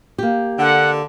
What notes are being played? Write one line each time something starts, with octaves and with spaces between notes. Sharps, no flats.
A#3 G4
D3 F#5